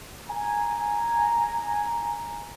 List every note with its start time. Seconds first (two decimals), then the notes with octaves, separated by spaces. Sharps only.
0.29 G#5 A#5